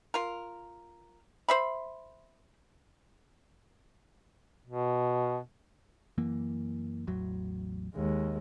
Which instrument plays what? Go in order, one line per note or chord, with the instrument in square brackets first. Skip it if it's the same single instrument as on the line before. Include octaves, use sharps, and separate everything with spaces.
[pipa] F4 A#4
C5 E5 B5
[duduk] B2
[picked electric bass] F#2 E3 A#3
A1 E2 F#3
[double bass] D#2 G#3